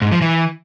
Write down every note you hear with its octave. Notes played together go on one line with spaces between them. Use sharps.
G#2
F3
E3